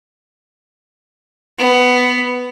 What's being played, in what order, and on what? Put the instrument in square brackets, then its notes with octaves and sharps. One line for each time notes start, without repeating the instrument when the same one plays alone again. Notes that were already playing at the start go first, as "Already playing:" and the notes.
[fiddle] B3